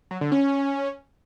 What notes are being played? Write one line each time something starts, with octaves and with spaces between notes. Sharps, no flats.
F#3
D3
C#4